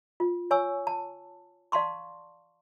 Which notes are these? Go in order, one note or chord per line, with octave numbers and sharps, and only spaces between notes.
F4
C#5 G#5 C#6 E6
A5
D5 F5 A5 C6 C#6